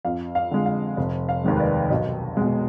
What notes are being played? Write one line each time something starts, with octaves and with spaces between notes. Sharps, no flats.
F2 F5
F5
D3 G#3
F5
F1
F5
D#2 D#3 G#3
B4
D5
B1 D#5
B2 G#3